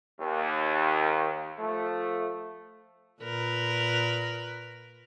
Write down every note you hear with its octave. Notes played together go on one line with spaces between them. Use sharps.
D#2
F3 A3
A#2 A#4 B4